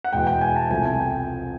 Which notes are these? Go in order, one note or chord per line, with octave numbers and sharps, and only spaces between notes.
F#5
E2 B2 G#3 G5
G5
G#5
A5
C2 C3 F3 A3 G#5
G#5
G5